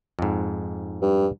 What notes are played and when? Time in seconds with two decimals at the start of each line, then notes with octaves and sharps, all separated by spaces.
0.19 F2 G#2
1.02 G2